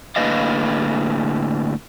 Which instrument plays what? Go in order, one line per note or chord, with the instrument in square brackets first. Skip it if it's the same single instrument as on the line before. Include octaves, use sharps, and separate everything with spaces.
[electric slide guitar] A2 D3 A#3 B4 D#5 F5